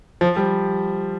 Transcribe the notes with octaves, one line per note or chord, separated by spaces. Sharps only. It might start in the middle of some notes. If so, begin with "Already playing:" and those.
F3
G3